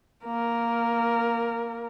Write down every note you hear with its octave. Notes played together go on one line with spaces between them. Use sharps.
A#3 A#4